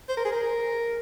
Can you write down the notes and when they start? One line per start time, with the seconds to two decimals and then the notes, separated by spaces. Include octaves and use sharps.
0.09 C5
0.17 A#4
0.25 G#4
0.32 A#4